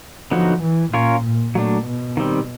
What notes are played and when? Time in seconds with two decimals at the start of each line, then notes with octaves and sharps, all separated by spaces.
0.31 D3 F3 F#3 B3 D#4 F#4
0.63 E3
0.93 A#2 C#4 F4 A#4 C#5
1.24 A#2
1.55 A#2 F#3 A3 D4
1.87 B2
2.17 D#3 G3 C4